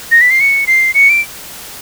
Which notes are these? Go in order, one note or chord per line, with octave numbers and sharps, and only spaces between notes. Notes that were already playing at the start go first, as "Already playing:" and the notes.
A#6
B6
C7
C#7
C7
C#7
D7